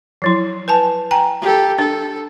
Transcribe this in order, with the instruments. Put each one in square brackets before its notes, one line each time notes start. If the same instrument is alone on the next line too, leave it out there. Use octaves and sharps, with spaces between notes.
[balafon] F3 F#3 E4
B4 G#5 A5
G5 G#5 A#5
[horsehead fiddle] G4 A4
[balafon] D4 [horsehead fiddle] A4